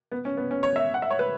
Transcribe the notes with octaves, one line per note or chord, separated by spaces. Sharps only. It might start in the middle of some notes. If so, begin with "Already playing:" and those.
B3
C#4
B3
C#4
C#5
E5
F#5
E5
C#5
B4